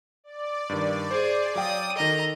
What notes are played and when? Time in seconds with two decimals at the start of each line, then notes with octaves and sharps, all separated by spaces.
0.24 D5
0.69 G2 D#3
1.11 G#4 C5
1.56 F#3 F5 G5 D#6
1.96 D#3 A4 D#5 A#5